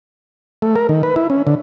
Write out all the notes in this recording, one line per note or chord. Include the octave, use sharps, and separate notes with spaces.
A3
A#4
D#3
B4
E4
C#4
D3